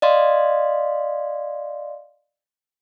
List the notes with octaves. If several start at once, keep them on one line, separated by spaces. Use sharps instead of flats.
D5 D#5 F5 C6